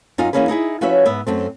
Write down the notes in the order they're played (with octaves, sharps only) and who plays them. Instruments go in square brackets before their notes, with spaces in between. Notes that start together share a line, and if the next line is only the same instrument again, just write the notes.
[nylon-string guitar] F#2 D#4 F4 F5 G#5
E3 G#3 A#3 C#4 G#4 B4
D#4 E4 G#4 E5
F3 C#4 F#4 B4 C#5 E5
G#2 B3 E5
F#2 A3 C4